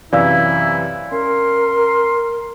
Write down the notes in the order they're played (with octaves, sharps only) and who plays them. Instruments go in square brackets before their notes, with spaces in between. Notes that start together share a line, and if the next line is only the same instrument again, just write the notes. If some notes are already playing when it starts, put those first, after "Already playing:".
[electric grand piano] F#2 C3 E3 [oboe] E4 [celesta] D5 F5 E6
[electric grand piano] C#4 [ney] A#4 [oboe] C6